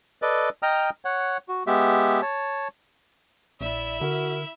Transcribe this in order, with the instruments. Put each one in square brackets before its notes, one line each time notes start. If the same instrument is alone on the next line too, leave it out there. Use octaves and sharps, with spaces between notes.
[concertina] A4 B4 D5 D#5
D#5 G5 A#5 D#6 F6
C#5 F#5
F#4
G#3 B3 G4 E5
C#5 A5
[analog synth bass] A#1 [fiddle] E4 E5 [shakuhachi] D5
[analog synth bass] D3 [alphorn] F#4 [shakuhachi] A#4